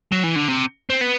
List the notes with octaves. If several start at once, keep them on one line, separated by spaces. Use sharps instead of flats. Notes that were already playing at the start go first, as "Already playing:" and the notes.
F#3
E3
D3
C3
C4
B3